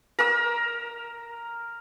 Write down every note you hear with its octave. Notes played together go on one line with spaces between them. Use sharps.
A#4 E6